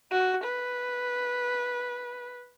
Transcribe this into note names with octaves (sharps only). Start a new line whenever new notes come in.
F#4
B4